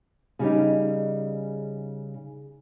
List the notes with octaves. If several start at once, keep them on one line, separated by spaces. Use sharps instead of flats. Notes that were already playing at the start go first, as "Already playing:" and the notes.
C#3 G3 D#4